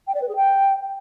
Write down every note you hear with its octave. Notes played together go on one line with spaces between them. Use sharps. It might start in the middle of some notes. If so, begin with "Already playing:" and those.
G5
D5
B4
G#4
G5